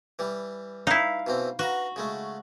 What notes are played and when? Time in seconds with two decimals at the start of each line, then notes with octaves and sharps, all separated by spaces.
0.19 E3 G3
0.87 D#4 E4 F5
1.27 B2 E3 C4
1.59 F#4 B4 F5 A#5
1.96 C#3 G#3 A3